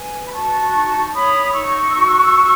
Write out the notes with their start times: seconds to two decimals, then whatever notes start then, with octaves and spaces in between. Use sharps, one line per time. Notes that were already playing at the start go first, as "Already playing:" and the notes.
Already playing: B4 G#5
0.27 B5
0.32 F#4 A5 C#6
0.73 D#4
1.13 C#5 B5 D#6
1.53 D#4 C#6 E6
1.95 F#4
2.34 F#4